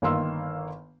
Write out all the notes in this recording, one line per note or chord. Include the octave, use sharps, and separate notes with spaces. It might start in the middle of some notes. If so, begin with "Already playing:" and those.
G1 D#3 A#3 F5 C6 E6